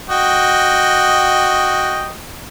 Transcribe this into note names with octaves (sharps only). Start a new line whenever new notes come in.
F#4 D#5 G5